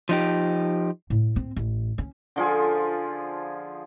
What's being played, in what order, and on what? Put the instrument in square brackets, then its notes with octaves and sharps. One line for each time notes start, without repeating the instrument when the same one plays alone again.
[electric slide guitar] F3 D#4 G4
[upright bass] A2
C4
A1
C#4
[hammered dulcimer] D3 F3 F4 G#4